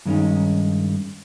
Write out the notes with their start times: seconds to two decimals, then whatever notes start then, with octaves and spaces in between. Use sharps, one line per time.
0.06 G2 D#3 G#3 B3 C#4 D#4